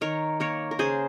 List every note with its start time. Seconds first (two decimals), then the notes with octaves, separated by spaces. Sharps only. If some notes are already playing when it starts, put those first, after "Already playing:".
0.01 D#3 A#4 C#5
0.40 A#3 A#4 C#5
0.71 A#4
0.79 C#3 G#4 C5